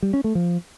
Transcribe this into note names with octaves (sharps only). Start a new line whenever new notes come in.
G3
C#4
A3
F3